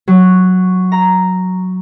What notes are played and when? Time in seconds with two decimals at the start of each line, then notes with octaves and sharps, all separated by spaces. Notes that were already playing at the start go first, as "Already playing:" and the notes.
0.08 F#3
0.92 A#5